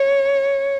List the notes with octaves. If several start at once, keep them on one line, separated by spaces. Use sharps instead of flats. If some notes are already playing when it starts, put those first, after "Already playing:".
Already playing: C#5